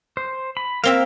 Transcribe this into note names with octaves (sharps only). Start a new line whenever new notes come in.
C5
B5
A#3 C4 E5 F5